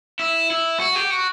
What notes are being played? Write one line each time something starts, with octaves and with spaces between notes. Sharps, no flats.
E4
E4
F#4
G4
F#4